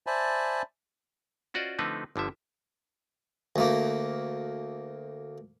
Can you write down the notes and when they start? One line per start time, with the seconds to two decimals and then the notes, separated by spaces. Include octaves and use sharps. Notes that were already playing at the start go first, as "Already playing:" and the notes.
0.07 C5 D5 E5 G#5 A5 B5
1.54 C#4 F4 F#4 C5 D5 D#5
1.79 D3 F3 A3 C4 D#4 B4
2.16 G1 D3 F3 E5
3.56 D2 A3 A#3